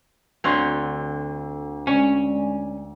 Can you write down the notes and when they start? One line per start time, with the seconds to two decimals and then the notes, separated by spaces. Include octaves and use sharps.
0.44 D2 D3 C4 C#5 F#6
1.87 G#3 C#4 D5 G#5